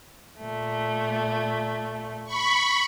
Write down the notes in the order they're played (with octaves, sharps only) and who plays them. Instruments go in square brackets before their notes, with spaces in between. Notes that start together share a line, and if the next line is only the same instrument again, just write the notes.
[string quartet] A#2 A3
[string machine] B5 C#6